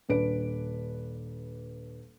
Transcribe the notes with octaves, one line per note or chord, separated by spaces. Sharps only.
D#1 D4 B4 D7